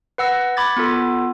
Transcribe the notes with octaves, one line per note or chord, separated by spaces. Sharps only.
B4 F#5 E6 A#6
B5 D6 G#6 A6
B3 F4 A4